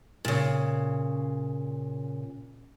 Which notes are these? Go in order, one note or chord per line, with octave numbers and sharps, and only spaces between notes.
A#2 C#3